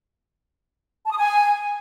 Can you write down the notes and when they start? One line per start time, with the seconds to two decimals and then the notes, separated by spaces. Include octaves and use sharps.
1.06 A5
1.12 D#6
1.17 G#5